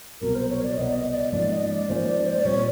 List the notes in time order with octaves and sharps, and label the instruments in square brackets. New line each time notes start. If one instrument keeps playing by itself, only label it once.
[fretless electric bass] C2 B2 F#3 B3 [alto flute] A#4
[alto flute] C5
C#5
D5
[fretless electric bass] C2 B2 F#3 B3 [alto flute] D#5
[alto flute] D5
D#5
D#5
D5
[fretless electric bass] G#2 F3 A#3 C#4 [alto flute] D5
[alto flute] D#5
D5
[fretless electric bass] G#2 F3 A#3 C#4 [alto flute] C5
[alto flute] D5
C5
D5
[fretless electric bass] A#2 G3 C4 [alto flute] C#5